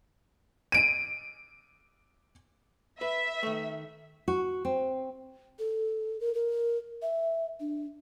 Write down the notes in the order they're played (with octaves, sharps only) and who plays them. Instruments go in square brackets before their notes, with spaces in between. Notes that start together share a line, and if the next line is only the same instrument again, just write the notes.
[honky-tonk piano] D7 D#7
[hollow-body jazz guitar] B4 [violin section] E5
[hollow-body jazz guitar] D#3 A3
[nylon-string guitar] F#4
C4
[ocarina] A4
A#4
A#4
E5
D4